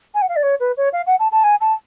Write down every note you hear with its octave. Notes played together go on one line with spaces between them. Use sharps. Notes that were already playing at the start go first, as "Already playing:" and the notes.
G#5
F#5
F5
D5
C#5
B4
C#5
F5
F#5
A5
A5
G#5
A5